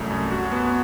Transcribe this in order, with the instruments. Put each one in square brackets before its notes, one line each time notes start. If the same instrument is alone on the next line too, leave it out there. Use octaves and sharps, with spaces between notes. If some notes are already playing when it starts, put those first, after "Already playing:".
Already playing: [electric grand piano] C2 F#2 A3
F#2
F#4
B3